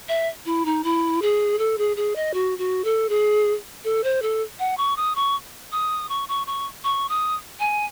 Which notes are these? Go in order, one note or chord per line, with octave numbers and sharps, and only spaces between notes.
E5
E4
D#4
E4
G#4
A4
G#4
G#4
D#5
F#4
F#4
A4
G#4
A4
C5
A4
F#5
C#6
D#6
C#6
D#6
C#6
C#6
C#6
C#6
D#6
G#5